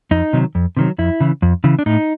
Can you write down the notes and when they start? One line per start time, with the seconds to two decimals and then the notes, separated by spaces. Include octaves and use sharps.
0.11 F2 D#4
0.33 C3 D#3 F#3
0.55 F2
0.77 C3 D#3 F#3
0.98 F2 E4
1.20 C#3 E3
1.42 F2
1.64 C#3 E3
1.79 D4
1.86 A2 D#4